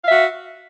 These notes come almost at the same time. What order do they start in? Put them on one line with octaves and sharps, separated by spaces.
F5 E5 F#4